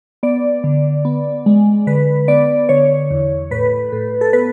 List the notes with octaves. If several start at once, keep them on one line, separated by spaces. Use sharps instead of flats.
B3 D5
D3
B3
G#3
D3 B4
B3 D5
D3 C#5
E2
A2 B4
A2
A4
B3 B4